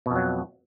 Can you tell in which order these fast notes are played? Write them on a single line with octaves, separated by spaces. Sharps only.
B2 F2 F#3